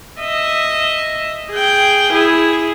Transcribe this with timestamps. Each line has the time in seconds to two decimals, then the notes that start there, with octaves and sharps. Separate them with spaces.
0.20 D#5 E5
1.51 G#4 G5
2.13 E4 G#4